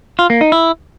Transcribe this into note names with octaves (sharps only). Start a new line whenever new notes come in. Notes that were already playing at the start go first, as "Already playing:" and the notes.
F4
A#3
D#4
E4